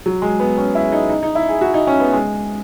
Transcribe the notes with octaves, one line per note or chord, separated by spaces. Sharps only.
F#3
G#3
B3
C#4
E4
D#4
D#4
D#4
E4
G#4
F#4
D#4
C#4
B3
G#3